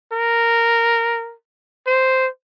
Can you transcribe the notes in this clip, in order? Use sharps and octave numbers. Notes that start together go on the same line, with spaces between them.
A#4
C5